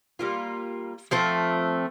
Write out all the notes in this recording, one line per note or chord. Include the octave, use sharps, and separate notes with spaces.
G3 A#3 F4
F3 A3 C4